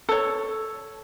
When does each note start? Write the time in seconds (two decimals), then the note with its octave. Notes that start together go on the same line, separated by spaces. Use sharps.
0.09 A4 C#5